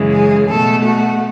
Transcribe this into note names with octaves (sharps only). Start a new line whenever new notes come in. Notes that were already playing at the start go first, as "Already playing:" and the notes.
Already playing: F#2 C#3 E3 G#3
G#4
B2 A3 A4
F#4